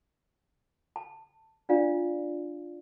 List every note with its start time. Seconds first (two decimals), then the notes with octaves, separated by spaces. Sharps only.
0.96 A5
1.69 D4 F4 D5 F5